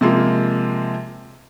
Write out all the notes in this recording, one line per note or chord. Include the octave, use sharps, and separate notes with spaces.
C3 F3 G#3 A#3